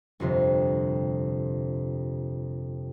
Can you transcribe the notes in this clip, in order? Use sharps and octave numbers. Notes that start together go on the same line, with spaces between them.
G1 F2 C3